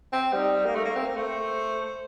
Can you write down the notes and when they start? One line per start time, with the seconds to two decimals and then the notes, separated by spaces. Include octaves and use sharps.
0.13 C4
0.33 G3 D#4
0.66 A#3
0.75 A3 A#4
0.85 A#3
0.95 C4
1.06 A#3
1.16 A3 C5